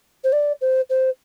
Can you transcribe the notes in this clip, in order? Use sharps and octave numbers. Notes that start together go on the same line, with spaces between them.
C5
D5
C5
C5